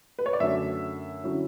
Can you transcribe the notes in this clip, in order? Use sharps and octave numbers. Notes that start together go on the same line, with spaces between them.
B4
C#5
D5
F#2 D3 A3 E5
D3 F#3 C#4 E4